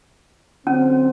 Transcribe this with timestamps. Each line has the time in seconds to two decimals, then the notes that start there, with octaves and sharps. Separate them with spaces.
0.67 D3 F#3 C4 C#4